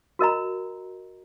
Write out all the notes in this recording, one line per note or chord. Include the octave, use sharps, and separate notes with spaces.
F#4 A#4 D#5 A#5